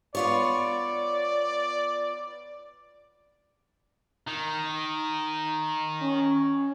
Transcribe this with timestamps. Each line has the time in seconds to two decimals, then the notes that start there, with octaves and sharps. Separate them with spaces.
0.15 B3 F4 C#5 D5
4.27 D#3
6.01 C#4